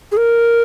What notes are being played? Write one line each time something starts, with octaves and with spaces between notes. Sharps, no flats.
G#4
A#4